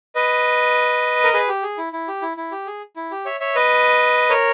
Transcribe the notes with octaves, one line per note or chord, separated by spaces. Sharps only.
B4 D#5
A#4
G#4 B4
G4
G#4
E4
E4
G4
E4
E4
G4
G#4
E4
G4
C#5 E5
C#5 E5
B4 D#5
A#4 C#5